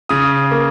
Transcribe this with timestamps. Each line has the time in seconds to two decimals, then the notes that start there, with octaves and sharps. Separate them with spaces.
0.09 C#3 D#6
0.51 A#3